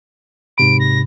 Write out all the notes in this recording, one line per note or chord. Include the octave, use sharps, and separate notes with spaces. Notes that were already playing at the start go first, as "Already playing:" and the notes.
G#2 C3 B5 D7
A#6